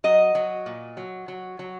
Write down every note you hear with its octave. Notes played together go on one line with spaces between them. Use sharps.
F#3 D#5
F#3
A#2
F#3
F#3
F#3